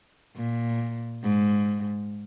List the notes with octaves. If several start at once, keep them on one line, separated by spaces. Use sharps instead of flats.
A#2
G#2